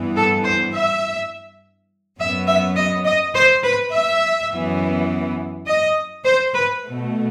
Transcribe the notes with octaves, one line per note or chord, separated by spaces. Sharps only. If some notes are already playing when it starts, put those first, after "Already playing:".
Already playing: G2 E3 B3
A4
C5
E5
F#2 F#3 B3 E5
E5
D#5
D#5
C5
B4
E5
F#2 E3 B3
D#5
C5
B4
B2 A3